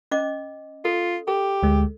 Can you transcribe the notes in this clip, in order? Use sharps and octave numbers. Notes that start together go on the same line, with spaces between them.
C#4 D#5 D6
F4 A4
G4 A4
D2 G#3